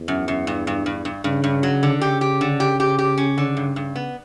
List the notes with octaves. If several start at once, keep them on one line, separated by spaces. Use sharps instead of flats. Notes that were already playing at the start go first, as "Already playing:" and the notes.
Already playing: E2
F#2
F#2
G2
G2
G2
G2
G2 C#3
G2
F#3
D3
C#3 G4
G4
D3
G4
G4
G4
C#4
D3
G2
G2
B3